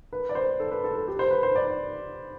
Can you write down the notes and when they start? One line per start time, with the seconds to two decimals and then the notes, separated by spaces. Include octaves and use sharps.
0.13 B4
0.29 D5
0.35 C5
0.60 A4
0.71 B4
0.84 A4
0.96 A4
1.08 G4
1.19 C5
1.31 B4
1.43 C5
1.56 D5